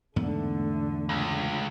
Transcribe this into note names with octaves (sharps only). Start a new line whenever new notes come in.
E2 G#2 D3 A3 B3
C#2